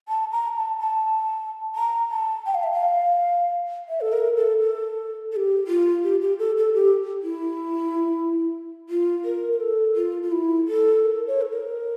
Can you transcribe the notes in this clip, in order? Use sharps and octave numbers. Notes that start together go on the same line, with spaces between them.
A5
A#5
A5
A5
A#5
A5
G5
F5
E5
F5
E5
A4
A#4
A4
A4
A4
G4
F4
G4
G4
A4
A4
G4
E4
F4
A#4
A#4
A4
F4
F4
E4
A4
A#4
C#5
A4
A#4